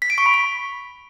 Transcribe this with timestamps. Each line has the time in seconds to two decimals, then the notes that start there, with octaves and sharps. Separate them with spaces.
0.02 B6
0.10 D7
0.18 C#6
0.26 B5
0.34 B6